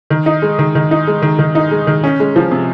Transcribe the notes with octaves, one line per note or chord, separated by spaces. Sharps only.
D#3
D#4
G#3
D#3
D#3
D#4
G#3
D#3
D#3
D#4
G#3
D#3
C#4
G#3
F3
C3